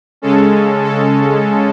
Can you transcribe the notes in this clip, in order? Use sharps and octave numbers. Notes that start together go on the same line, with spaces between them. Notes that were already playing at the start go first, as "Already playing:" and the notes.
C#3 G#3 C#4 A4
A4